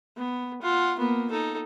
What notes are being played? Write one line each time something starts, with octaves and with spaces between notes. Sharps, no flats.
B3
F4 F#5
A#3 B3
D#4 A4